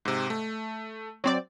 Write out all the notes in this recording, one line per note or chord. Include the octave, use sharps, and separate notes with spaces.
G#2 C3
A3
F#3 C4 D5